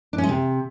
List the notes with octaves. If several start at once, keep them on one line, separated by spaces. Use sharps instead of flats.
D4
C#4
G#3
C3